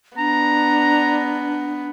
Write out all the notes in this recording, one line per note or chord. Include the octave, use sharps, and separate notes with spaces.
B3 D4 A#5